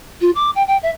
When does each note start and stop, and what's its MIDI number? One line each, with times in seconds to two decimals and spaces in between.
0.21 0.31 65
0.35 0.50 86
0.55 0.63 79
0.67 0.77 79
0.82 0.90 76